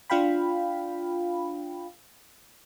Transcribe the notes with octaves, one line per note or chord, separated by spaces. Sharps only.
D4 F4 F5 G5 B5